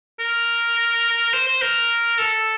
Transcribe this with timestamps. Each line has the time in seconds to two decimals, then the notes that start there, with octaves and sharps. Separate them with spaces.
0.20 A#4
1.34 C5
1.48 C5
1.62 A#4
2.18 A4